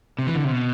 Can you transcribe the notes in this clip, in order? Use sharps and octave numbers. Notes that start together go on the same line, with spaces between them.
C3
E3
D3
C3
B2